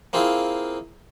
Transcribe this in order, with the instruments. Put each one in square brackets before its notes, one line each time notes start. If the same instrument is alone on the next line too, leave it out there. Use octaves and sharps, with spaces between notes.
[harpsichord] A#3 C4 E4 F4 G#4